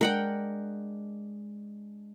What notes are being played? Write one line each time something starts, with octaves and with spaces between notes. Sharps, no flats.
G#3 D4 A#4 D5 F#5 G5